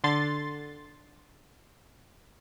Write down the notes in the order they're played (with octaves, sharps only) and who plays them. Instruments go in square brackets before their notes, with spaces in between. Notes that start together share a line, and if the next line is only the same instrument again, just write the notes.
[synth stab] D3 C6 A6